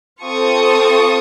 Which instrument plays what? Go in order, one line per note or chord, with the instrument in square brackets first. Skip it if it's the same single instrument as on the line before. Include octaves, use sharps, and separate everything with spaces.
[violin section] C4 F4 A4 C#6 D#6